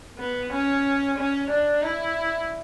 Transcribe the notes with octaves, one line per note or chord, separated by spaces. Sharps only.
B3
C#4
C#4
D4
E4